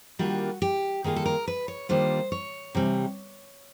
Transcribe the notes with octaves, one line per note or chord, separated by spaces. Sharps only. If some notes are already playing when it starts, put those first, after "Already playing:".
D#3 G3 A#3 D4 F4 F#4
G4
D#3 G3 A#3 D4 F4 G#4
A4
A#4
B4
C#5
D#3 G3 A#3 D4 F4 C5
C#5
C3 E3 G3